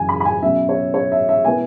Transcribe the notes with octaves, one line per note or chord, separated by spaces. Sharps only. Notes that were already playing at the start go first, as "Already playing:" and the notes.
Already playing: F#2 C#3 E3 G#5
B5
B5
G#5
B2 F#3 C#4 E5
C#5
C#5
E5
E5
B2 B3 E4 G#5